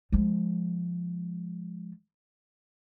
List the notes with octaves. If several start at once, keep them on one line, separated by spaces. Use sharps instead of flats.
F3 G#3